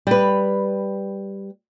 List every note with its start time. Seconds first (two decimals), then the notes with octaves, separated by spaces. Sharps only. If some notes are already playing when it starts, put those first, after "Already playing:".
0.07 G3 B4